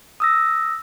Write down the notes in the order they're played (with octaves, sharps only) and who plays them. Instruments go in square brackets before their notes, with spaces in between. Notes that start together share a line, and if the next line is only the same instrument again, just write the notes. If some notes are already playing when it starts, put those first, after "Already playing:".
[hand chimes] D#6 E6 A#6